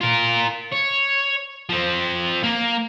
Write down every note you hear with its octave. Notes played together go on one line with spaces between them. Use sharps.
F4 A#4
C#5
F3 C4
A#3